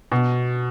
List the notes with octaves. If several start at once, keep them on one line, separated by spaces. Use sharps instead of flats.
B2